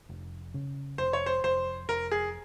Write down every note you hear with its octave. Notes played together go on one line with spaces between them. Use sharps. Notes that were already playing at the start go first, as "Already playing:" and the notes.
F1
C#3
F1 C5
C#5
C5
F1 C5
F1 A#4
G#4